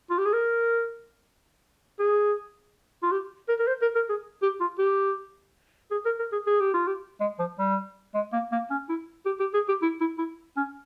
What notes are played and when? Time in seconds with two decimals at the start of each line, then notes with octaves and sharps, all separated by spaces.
0.10 F4
0.18 G4
0.25 G#4
0.33 A#4
2.00 G#4
3.03 F4
3.12 G4
3.49 A#4
3.59 A#4
3.68 C5
3.82 A#4
3.95 A#4
4.09 G#4
4.42 G4
4.61 F4
4.79 G4
5.91 G#4
6.05 A#4
6.19 A#4
6.32 G#4
6.47 G#4
6.60 G4
6.74 F4
6.87 G4
7.21 G#3
7.39 F3
7.59 G3
8.14 G#3
8.33 A#3
8.52 A#3
8.71 C#4
8.89 E4
9.26 G4
9.40 G4
9.54 G#4
9.68 G4
9.82 E4
10.01 E4
10.18 E4
10.57 C#4